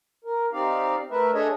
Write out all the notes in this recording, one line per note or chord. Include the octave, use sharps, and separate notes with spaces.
A#4
C4 D#4 G4 D5 F5
A3 A#4 B4 E5
D4 G#4 A4 C#5 D#5 E5